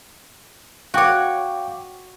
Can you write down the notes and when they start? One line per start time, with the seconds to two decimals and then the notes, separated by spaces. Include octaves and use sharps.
0.94 F#4 C#5 F5 G5 D6